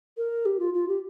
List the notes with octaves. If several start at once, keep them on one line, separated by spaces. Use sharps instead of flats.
A#4
G4
F4
F4
G4